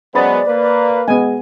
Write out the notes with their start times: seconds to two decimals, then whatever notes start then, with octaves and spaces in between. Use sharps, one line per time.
0.15 F#3 G#3 B3 C5 D5 B5 A6
0.47 A#3 B4
1.08 G#3 B3 D#5 G#5